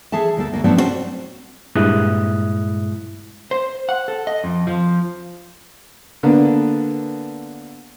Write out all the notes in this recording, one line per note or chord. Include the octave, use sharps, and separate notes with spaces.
E3 G#4 A4 E5 A5
D2 A#3 A4
D2 A#3
F3 F#3 A3 B3 C4 D4
C4 C#4 E4 F#4 C5
G2 A#2 G#3 E4 D#6 F#6
C5
F#5
A4
D#5
F2
F3
D3 A#3 B3 D4